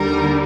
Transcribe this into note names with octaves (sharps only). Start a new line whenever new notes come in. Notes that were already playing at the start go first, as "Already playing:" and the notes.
Already playing: D#2 D3 G3 A#4